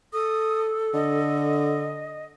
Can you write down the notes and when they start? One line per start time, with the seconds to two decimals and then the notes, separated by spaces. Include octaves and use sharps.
0.13 A4 D#6
0.94 D3 D#5